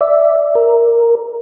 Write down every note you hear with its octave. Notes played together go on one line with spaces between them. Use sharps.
D5 E5
A#4